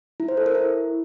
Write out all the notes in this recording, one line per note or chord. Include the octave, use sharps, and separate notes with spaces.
E4
C5
A4
A#4
E4